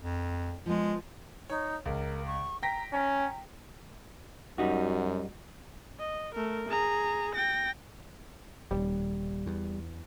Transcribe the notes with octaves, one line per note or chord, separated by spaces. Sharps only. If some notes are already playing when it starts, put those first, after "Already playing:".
F2
F3 G#3 B3
D#4 C#5
C#2 A#4
C#6
G5 A#5 A#6 B6
C#4 A#5
F#2 G3 D#4 F#4
D#5
A3 A#4
G#4 A#5
G5 A#6
D#1 G3
E2